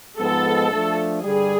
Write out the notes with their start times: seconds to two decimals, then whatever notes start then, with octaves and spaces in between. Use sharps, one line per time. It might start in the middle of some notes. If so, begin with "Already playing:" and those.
0.18 G#2 F3 G#3 B3 A4
0.71 F3 A3 D4
1.22 G2 D3 G3 G#4